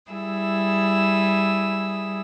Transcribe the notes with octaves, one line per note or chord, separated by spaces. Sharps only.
G3 E4 G#4 E6